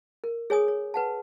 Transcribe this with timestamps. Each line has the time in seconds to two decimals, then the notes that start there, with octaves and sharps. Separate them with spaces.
0.24 A#4
0.50 G#4 C#5 G#5 D#6
0.68 C#5
0.94 B4 F#5 A5